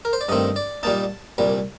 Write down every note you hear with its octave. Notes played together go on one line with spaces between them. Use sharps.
A#4
C5
D5
G2 D#3 A3 C4 D#5
D5
A#2 G3 A#3 D#4 A5
C2 A#2 G3